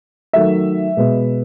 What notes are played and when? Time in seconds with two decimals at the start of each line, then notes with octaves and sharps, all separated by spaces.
0.33 D#3 F#3 A3 E5
0.97 B2 G#3 B3